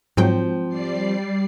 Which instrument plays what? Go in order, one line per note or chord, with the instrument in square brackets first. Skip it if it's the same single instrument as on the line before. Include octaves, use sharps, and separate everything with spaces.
[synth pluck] G#2 F#3 G5 [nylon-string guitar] F3 C4
[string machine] G3 D5 C7